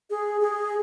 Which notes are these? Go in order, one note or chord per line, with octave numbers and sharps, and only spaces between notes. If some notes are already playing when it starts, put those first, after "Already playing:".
G#4
G#4